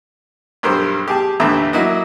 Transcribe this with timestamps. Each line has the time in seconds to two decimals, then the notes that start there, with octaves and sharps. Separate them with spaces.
0.63 B1 G2 A#4 C5
1.08 G4 G#4 A5
1.40 D#2 A2 D3 E3 E5 A#5
1.73 F#3 A#3 E4 F#4 D#5